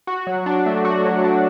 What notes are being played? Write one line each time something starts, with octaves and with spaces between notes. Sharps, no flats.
F#4
F#3
D4
A3
F#4
F#3
D4